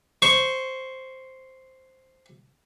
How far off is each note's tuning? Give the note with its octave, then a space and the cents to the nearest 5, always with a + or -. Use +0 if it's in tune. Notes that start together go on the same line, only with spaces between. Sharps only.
C5 +0 C#6 +0